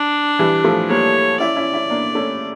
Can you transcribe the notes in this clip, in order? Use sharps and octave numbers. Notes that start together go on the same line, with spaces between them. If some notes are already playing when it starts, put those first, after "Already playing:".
Already playing: D4
E3 G3
F3 A3
G3 A#3 C#5
C#4 E4 D5
C#4 E4
C#4 E4
A#3 D4
A3 C#4